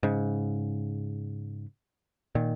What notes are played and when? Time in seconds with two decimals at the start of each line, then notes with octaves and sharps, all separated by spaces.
0.03 G#2 C#3
2.35 A#2 D#3